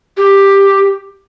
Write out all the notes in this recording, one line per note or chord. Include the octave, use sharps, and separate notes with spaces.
G4